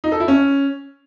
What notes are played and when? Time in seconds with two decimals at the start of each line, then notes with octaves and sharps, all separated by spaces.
0.04 D#4
0.12 A4
0.20 E4
0.28 C#4